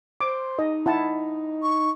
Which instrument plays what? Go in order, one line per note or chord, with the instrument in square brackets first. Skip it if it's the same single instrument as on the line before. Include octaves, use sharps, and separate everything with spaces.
[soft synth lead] C5 [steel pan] D6
[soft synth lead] D#4 [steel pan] D#5
[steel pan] E4 F#5 A5
[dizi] C#6